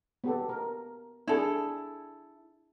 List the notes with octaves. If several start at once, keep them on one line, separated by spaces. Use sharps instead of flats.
B3 G4 A4
A#4
D4 E4 G#4 A4